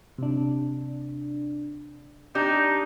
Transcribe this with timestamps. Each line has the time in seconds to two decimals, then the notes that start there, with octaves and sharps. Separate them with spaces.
0.18 C3 D4
2.35 D4 D#4 G4 G6